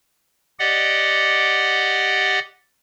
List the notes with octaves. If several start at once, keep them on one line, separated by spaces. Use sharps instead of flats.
G4 D5 D#5 F#5